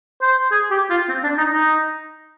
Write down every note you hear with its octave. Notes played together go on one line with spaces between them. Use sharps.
C5
G#4
G4
F4
C4
D4
D#4
D#4